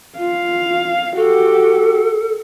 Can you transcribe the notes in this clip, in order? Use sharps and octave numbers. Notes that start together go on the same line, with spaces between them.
F4 F5
F#4 G4 A4